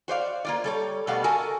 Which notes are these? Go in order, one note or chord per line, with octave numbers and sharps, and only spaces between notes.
F#4 C5 D5 F5
A#3 F4 D5
G3 A4 C#5
B2 G3 A3 D5 F5 F#5
F#4 A4 A#4 G#5 A5